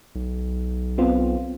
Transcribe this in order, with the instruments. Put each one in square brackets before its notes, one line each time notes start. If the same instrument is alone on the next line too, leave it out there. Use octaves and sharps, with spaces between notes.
[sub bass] B1
[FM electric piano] B3 C4 F4